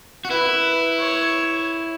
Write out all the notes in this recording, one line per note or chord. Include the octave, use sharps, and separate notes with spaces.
F#4
E4 B4
C#5